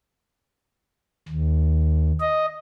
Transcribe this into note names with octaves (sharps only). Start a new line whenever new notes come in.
D#2
D#5